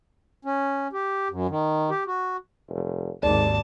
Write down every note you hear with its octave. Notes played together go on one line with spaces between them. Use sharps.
C#4
G4
F#2
D#3
G4
F#4
F1
G#1 D#2 G#2 D5 A5